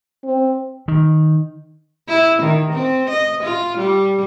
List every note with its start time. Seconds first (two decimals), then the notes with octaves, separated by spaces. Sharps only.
0.24 C4
0.88 D#3
2.08 E4
2.42 D#3
2.73 C4
3.09 D#5
3.43 F4
3.78 G3